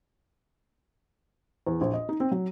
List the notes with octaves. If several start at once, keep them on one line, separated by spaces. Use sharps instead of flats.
E2
A#1
D#5
D#4
C4
F#3